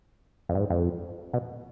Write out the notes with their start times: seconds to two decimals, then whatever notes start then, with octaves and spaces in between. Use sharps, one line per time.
0.49 F2
0.55 G2
0.60 G#2
0.70 F2
1.33 B2